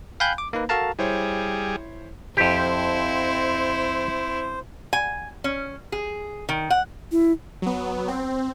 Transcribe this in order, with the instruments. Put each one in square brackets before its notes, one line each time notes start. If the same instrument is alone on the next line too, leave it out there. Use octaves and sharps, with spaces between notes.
[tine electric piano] F5 G5 G#5 B5 F#6 G6
D6
A#3 D#4 B4
F#4 A4 A#4 F5 A5 A#5
[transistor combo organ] G3 G#4 [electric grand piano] E4 C5 C#5
[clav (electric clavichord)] F2 G4 [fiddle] C4 E4 [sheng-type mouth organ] C5
[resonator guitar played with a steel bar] G#5
C#4
G#4
D#3
F#5
[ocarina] E4
[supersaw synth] F#3 B3
C4